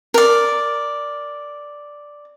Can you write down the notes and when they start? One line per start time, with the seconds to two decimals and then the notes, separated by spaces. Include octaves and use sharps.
0.14 A#4 D5